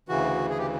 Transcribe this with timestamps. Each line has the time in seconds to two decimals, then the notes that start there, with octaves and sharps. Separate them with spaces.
0.08 D2 C#3 E3 F#4
0.50 G#4
0.59 G4